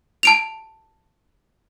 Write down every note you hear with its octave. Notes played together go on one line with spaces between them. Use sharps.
A5 D7 F7